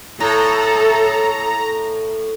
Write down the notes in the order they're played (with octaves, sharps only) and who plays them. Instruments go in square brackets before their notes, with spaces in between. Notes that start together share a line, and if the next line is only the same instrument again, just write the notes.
[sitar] A2 [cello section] A4 [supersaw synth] A#5